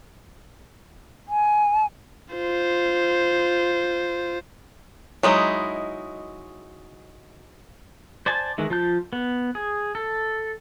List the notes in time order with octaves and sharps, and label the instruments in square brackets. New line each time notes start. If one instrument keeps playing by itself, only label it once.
[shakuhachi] G#5
[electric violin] F4 C5
[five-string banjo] F#3 G#3 D#4 E4
[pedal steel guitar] C5 D5 G#5 A5
D#3 E3 G#3
F3 F4 A5 G6
B3
G#4
A4